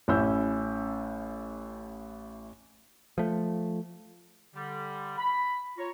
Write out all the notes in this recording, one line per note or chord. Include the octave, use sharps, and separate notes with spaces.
A1 C#4 E4 E6 G6
F3 A3
D3 G3
B5
F4 C#5 A#5 C#6